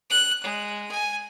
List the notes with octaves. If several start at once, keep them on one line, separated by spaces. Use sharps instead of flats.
F#6
G#3
G#5